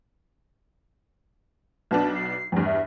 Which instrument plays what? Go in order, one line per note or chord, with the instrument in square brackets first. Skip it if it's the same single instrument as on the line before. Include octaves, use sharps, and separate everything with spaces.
[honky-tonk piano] B1 B3 D4 [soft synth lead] A5
[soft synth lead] C7
[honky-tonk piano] E2 G2 [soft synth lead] F3
[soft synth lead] E5